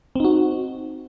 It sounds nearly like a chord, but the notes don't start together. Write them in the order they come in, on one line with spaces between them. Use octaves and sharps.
C4 D#4 F#4